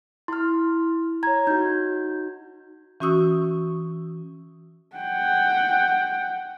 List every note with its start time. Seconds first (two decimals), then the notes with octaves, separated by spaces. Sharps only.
0.28 E4 C6 F6
1.23 C#5 A#5 G#6
1.47 D#4 F#4 G6
3.00 E3 C#4 F#4 C#6 D#6 E6
4.97 F#5 G5